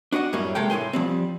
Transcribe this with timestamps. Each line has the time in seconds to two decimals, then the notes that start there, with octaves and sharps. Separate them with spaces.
0.12 D4 F#4 D#5 F#5
0.33 F#2 A2 G3 A#3 C#4
0.55 C3 G#3 A4 A#4 G5
0.70 C2 A2 F3 G#5 C6
0.93 F3 G3 C4